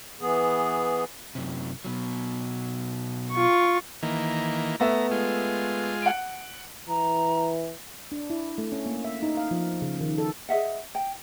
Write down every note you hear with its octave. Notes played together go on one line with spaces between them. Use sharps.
E3 B3 G#4
F#2 C3
B2 F#3
F4 C#6
D#3 E3 A#3
A3 B3 E5 A#5
G#3 F4
F#5 D7
E3 A#5
D4
E4
A3
C#4
A#3
E5
D#4
F5
F3
C#3
D#3
A4
G#4 D#5 E5 F#5
G5